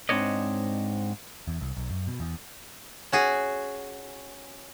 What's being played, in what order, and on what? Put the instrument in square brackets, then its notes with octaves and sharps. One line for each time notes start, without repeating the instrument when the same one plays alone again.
[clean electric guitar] G#2 C4 D4 C#5 D#5
[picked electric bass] E2
C2
B1
F#2
B2
E2
[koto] C#4 F#4 G#4